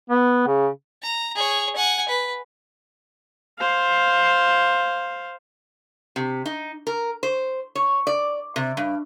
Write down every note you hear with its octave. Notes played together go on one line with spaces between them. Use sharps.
B3
C#3
A#5
G#4 C#5
F#5 G#5
B4
C5 F5
C3
D#4
A#4
C5
C#5
D5
C3
G2